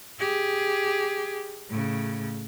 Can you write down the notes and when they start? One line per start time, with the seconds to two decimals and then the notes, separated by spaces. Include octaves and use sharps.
0.19 G4 G#4
1.69 A2 C#3